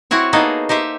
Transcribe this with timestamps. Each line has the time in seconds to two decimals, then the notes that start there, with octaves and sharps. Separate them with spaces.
0.11 C4 E4 F#4 C#5
0.33 A#3 B3 D#4 G#4 A4
0.69 D#4 G4 C5 E5